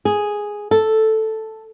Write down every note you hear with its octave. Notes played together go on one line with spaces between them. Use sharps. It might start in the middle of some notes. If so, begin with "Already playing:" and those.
G#4
A4